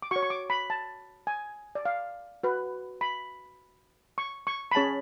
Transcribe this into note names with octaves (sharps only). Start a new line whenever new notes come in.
D6
F#4 C#5 C#6
C#6
D6
B5
A5
G#5
D5
F5
F#4 B4
B5
C#6
C#6
B5
C#4 G#4 C#5 A5